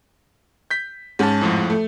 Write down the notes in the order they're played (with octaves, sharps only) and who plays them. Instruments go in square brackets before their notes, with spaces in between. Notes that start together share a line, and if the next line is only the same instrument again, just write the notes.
[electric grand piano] G6 B6
[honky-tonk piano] G#2 [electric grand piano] C#4 A5
[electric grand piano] F2 A2 F3
[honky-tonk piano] A3